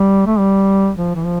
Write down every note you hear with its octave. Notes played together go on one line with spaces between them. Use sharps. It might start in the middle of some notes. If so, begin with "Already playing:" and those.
Already playing: G3
A3
G3
F3
E3
F3